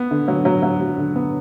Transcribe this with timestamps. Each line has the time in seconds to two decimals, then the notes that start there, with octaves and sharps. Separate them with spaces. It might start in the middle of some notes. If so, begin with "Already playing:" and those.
Already playing: B3
0.11 D3
0.28 F#3
0.45 F#3
0.62 F#3
0.80 F#3
0.98 D3
1.16 B3